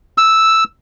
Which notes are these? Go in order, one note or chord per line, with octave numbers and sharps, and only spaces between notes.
E6